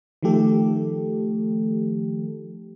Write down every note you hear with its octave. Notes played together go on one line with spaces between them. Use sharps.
D#3 F3 A3 G4 A4